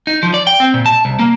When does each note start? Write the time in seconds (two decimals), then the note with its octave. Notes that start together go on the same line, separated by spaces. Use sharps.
0.07 D#4
0.23 F3
0.34 D5
0.47 G5
0.60 C4
0.74 A#2
0.86 A5
1.05 C2
1.19 A#3